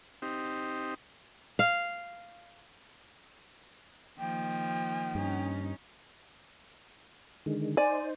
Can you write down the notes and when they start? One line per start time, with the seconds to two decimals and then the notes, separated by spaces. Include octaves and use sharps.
0.22 C4 D#4 G4
1.59 F5
4.19 D#3 F3 A#3 G5
5.15 G2 C#4 D#4
7.46 D3 D#3 G#3
7.77 D#4 C5 D5 G#5